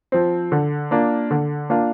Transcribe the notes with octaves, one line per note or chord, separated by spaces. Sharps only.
F3 C4
D3
A#3 D4 F4
D3
A#3 D4 F4